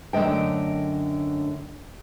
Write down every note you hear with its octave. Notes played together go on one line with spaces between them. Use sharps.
F#2 D3 A3 D#5 G5